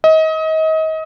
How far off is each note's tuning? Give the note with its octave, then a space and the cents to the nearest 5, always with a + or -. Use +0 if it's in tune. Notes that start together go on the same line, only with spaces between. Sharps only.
D#5 +30